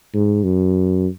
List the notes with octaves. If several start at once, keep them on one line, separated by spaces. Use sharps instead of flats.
G#2
F#2